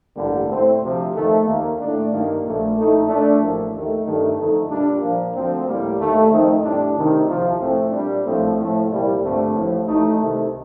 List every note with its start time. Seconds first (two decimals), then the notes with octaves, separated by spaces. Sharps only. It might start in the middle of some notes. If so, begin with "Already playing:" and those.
0.16 A1 G2 D3 G3 A#3
0.48 A2 A3 C4
0.81 D2 C3 F3
1.13 F2 D#3 A3
1.45 D#2 D#3 A#3
1.78 A2 A3 D4
2.10 G2 D#3 A#3
2.42 A#1 A#2 A3
2.75 A#1 A2 A3 D#4
3.07 A#2 A3 D4
3.39 A1 A2 F3 A#3
3.71 D#2 D#3 A3
4.04 G2 D#3 A3
4.36 F2 D3 A3 D#4
4.69 A#2 G3 D4
5.01 A#2 F3 A#3
5.34 D2 D3 F3 C4
5.66 A2 G3 A#3
5.98 D#2 D3 A3
6.30 F2 D#3 A3 C4 D#4
6.62 A2 G3 D4
6.94 D2 C3 D#3
7.27 C2 C3 F3
7.59 A2 A3 C4
7.91 A#2 G3 D4
8.24 A#1 A2 F3 A3 C4
8.56 A2 F3 A3
8.88 C2 A#2 G3 A#3
9.21 G2 D3 A3 C4
9.53 A1 A2 F3
9.85 A1 A2 A3 D#4
10.18 C2 C3 D#3 A3